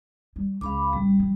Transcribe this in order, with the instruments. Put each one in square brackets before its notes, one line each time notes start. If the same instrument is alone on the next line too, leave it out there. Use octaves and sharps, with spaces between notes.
[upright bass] G3
[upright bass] C#2 [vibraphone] F5 B5 D6
[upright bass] A1 [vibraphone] G3
[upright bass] F3